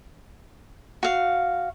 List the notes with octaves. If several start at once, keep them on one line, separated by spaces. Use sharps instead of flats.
F#4 F5